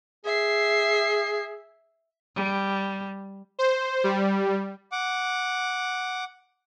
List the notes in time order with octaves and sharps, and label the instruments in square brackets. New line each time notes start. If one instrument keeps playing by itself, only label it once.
[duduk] G#4 [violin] E5 C7
[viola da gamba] G3
[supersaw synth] C5
G3
[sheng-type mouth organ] F#5 D6